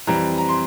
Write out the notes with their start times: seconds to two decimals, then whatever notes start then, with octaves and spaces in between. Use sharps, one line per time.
0.07 F2 E3 G3 C4 A#5
0.38 A#5
0.49 C6